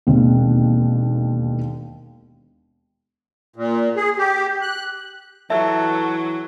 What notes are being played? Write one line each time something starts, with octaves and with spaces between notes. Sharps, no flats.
E1 D#2 C4
A#2
G#4
G4
F#6
E3 F#3 A4 E5